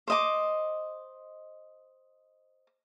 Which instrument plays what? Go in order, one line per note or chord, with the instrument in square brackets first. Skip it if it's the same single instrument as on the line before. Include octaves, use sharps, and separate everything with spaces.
[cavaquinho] C5 D#5 D6